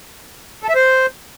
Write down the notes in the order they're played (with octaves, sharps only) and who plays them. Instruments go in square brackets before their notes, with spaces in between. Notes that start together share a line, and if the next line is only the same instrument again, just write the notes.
[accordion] A4
E5
C5